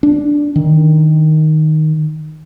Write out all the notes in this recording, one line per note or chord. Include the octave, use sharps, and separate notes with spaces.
D4
D#3